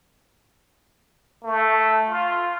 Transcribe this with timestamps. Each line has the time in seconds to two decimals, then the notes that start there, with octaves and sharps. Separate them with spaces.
1.44 A3
2.08 F4